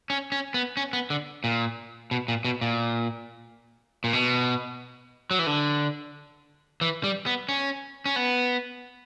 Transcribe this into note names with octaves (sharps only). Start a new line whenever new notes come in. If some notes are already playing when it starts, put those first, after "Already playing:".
C#4
C#4
B3
C#4
B3
D3
A#2
B2
A#2
B2
A#2
A#2
B2
F#3
E3
D3
E3
G3
B3
C#4
C#4
B3